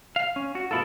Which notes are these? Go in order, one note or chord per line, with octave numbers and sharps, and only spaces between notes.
F5
C#4
F#4
B2 B3 E4 F4 A4